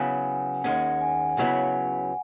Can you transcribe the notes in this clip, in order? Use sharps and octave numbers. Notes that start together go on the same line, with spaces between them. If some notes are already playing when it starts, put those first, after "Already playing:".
Already playing: C#3 F#3 B3 E4 F#5 G#5
D#2 D#3 G#3 C#4 F#5
G#5
C#2 C#3 F#3 B3 E4